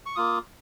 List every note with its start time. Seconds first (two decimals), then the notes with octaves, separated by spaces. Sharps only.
0.06 C#6
0.16 A#3 F4 D#6